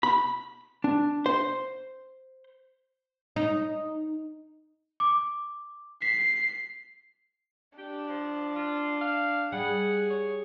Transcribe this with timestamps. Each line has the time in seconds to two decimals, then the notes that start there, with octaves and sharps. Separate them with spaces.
0.03 B5
0.84 D4
1.26 C5
3.36 D#4
5.00 D6
6.02 B6 C7
7.78 D4 G4
8.09 F3
8.55 F4
9.01 F5
9.52 G3 G#4 F#5
10.10 C#5